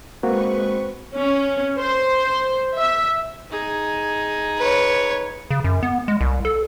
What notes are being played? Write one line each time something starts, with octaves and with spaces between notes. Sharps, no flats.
G#3 A#3 C4 F#4 B4 C#6
C#4
C5
E5
D#4 G#4
B4 C#5
C#3
F#2
B3
G#3
C2
A4